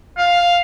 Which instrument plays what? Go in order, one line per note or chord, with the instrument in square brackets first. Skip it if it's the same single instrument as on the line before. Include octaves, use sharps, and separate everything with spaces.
[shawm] F5